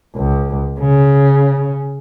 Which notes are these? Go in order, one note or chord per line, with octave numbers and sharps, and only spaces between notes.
C#2
C#3